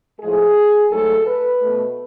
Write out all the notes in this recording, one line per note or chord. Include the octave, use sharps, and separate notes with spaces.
A2 F3 G#3 G#4
G#2 F#3 A3 A4
B4
B2 A3